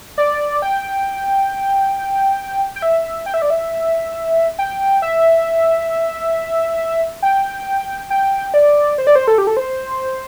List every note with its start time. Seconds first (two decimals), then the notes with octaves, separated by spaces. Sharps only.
0.18 D5
0.62 G5
2.76 G5
2.82 E5
3.26 G5
3.34 E5
3.42 D5
3.50 E5
4.59 G5
5.02 E5
7.22 G5
8.10 G5
8.54 D5
8.98 C5
9.07 D5
9.16 C5
9.28 A4
9.38 G4
9.47 A4
9.57 C5